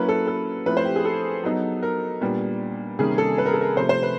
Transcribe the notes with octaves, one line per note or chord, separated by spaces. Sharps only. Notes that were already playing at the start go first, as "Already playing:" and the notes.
Already playing: F#3 A#3 C#4 E4 B4
A4
A4
F3 A3 C4 E4 B4
C5
G4
G#4
A4
F#3 B3 D#4
A#4
A#2 G3 B3 D4
C3 D#3 G3 A#3 C#4 G#4
A4
B4
A#4
A4
A#4
C3 F3 A3 C5
C5
B4